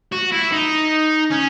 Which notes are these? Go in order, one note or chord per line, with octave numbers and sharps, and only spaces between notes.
F#4
E4
D#4
C#4